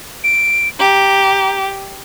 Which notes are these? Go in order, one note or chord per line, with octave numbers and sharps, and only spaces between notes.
D7
G4 A#5